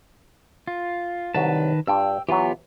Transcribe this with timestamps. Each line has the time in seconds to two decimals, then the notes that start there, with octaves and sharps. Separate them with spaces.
0.67 F4
1.34 C2 D#3 F#3 B4 A5
1.87 G2 D4 F4 G5 E6
2.29 E3 F#3 B3 F4 G4